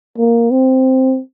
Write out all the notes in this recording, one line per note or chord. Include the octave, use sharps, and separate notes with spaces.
A#3
C4